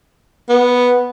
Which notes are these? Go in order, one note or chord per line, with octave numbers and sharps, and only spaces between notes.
B3